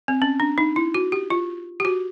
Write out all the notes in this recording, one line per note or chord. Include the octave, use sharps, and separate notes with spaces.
C4
C#4
D4
D#4
E4
F#4
G4
F4
G4
F#4